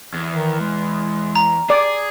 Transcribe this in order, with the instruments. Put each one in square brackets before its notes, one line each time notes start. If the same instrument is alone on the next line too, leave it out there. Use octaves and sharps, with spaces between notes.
[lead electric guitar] E2
[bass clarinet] D#3
G#3
[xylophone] A#5
[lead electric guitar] G#4 [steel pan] D5